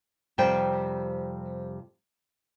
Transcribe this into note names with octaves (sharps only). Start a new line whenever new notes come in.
F2 C3 G3 C5 G5